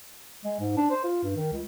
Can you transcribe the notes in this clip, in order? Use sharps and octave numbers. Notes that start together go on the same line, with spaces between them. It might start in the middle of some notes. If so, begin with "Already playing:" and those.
G#3
G#2
D4
C5
F4
G2
D#3
C#2